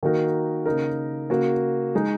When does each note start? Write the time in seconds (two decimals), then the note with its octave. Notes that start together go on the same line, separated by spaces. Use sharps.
0.03 D#3 A#3 D#4 F#4 A#4
0.66 C#3 A#3 D#4 A#4
1.30 C#3 A#3 F#4
1.95 G#3 D#4